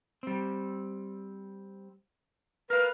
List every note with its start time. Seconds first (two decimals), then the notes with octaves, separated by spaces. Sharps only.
0.23 G3 C4
2.70 A#4 B4 F5 F6